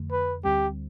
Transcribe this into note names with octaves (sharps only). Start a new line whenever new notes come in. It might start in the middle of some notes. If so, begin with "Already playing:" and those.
Already playing: F2 D3 A3
B4
D2 D3 G3 C4 G4